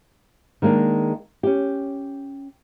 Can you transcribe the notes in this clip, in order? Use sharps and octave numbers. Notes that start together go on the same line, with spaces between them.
D#3 G#3 A#3 B3 D4
C#4 G4